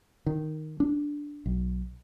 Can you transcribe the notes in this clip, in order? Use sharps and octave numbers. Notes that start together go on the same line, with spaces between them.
D#3
D4
B1